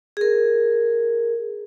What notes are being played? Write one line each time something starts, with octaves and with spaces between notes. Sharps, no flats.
G#4 A#4